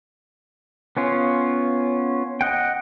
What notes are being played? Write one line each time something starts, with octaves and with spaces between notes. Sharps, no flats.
B3 C#4 F4
D#5 F#5 G5